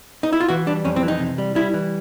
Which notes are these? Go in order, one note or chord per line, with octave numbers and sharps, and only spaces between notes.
D#4
E4
F4
E3 F#4
G3 D4
F2 C#4
C4
E3
D#4
C3
G3
G3 E4
E3